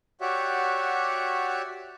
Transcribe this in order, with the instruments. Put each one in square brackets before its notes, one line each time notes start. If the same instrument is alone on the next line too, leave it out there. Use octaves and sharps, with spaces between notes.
[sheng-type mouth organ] F#4 G4 C#5 D5 E5 F#5